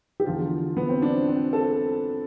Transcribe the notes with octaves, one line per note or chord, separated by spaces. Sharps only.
G4
E2 D3 F3 F4
B3
C4
D4
C4
A4